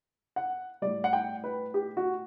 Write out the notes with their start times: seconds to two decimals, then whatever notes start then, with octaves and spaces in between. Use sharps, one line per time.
0.36 F#5
0.82 A2 G3 D5
1.04 F#5
1.13 G5
1.44 B4
1.74 G4
1.97 F#4